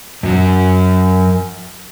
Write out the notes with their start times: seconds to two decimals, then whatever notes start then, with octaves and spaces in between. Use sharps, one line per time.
0.23 F#2 F#3